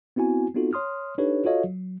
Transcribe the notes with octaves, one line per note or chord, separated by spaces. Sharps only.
B3 C4 E4 F#4 G#5
B3 C4 D#4 F4 F#4 A4
C#5 C6 D#6 F6
D4 D#4 G4 A4 B4 C#5
F4 F#4 A4 C#5 D#5 F5
F#3